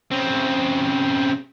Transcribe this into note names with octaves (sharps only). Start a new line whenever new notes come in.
C#3 C4